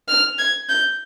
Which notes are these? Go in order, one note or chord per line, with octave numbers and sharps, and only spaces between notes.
F6
G#6
G6